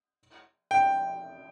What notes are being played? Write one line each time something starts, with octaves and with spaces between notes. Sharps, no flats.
G5